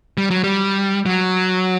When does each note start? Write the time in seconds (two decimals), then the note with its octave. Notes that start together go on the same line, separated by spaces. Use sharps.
0.18 G3
0.31 F#3
0.44 G3
1.06 F#3